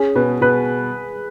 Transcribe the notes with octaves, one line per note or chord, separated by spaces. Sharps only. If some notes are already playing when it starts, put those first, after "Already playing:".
Already playing: C#4 G#4
B2 B4
B2 B4